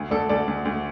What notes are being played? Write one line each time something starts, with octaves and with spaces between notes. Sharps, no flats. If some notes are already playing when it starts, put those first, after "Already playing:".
Already playing: D2
D2 A4 D5
D2 A4 D5
D2
D2